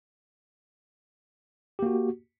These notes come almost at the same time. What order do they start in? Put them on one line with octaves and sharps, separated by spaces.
G4 A#3 F#4